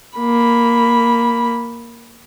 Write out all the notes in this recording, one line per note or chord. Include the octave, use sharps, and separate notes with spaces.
A#3 B5